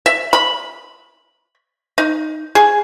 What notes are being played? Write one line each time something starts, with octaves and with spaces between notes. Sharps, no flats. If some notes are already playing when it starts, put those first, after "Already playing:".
E5
B5
D#4
G#4